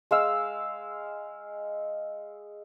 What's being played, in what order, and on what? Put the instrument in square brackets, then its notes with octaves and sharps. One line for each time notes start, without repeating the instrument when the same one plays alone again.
[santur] G#3 F5 E6